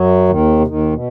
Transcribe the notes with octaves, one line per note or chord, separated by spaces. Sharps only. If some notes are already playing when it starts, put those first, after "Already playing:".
Already playing: F#2 F#3
D#2 D#3
C3
D#2 D#3
B2